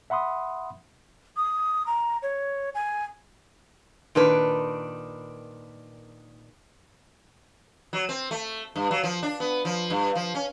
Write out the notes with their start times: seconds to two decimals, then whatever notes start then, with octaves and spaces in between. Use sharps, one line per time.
0.10 E5 F#5 B5 C6 D#6
1.37 D#6
1.87 A#5
2.22 C#5
2.75 G#5
4.15 A#2 D#3 D4 B4
7.93 F#3
8.09 C4
8.31 A3
8.76 G2
8.91 F#3
9.04 F3
9.23 D4
9.40 B3
9.65 F3
9.90 G2
10.15 F3
10.35 C#4